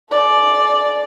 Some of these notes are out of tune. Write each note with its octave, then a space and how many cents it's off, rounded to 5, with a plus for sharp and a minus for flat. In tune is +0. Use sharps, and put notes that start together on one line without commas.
G#4 +45 D5 +0